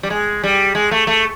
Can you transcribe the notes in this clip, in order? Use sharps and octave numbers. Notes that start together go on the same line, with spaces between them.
G3
G#3
G3
G#3
A3
A3